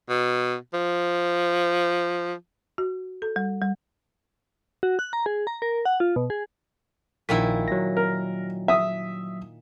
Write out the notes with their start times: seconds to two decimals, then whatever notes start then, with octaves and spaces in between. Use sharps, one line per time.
0.09 B2
0.74 F3
2.78 F#4
3.22 A4
3.36 G3
3.62 G3
4.83 F#4
4.99 F#6
5.13 A#5
5.26 G#4
5.47 A#5
5.62 A#4
5.85 F#5
6.00 F4
6.16 B2
6.30 G#4
7.29 A#1 A#2 D#3 E4 B6
7.68 F#3 A#6
7.97 A#4
8.68 E5 D#6